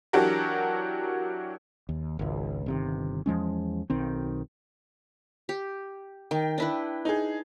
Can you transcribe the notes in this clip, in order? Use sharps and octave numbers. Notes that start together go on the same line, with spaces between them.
E3 F#3 D4 F#4 G4 A#4
D#2
G#1 C#2
G1 C3 D#3
E2 F3 G#3 C#4
B1 D#3 C4
G4
D#3 G5
D4 E4 B4
D#4 G#4